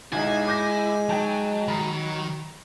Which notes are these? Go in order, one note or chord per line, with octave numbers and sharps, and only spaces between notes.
B1 G#3 D#4 E4 G#5
D6 G6 A#6
F#3 D#4 G5 A5
D#3 A#5 B5